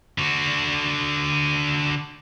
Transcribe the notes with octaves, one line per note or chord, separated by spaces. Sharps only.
D3 F#4